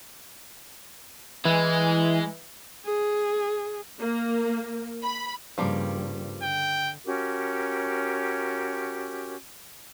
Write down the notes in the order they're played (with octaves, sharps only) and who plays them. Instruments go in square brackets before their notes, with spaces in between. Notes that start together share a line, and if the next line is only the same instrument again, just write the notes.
[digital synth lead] E3 [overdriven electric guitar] G#3
[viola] G#4
[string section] A#3
B5
[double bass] G2 C#3 [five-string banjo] F3 G3 A#3
[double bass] D3 [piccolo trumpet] G5
[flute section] C#4 F#4 G4 A#4